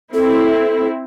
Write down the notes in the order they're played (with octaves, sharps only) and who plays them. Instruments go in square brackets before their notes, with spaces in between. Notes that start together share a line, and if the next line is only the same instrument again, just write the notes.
[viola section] C4 E4 [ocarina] A4